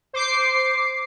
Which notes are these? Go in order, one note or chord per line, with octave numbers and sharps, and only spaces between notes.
C5 D6 C7